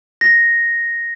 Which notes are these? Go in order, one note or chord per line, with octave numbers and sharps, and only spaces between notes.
A#6